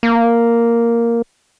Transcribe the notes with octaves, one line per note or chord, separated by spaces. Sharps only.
A#3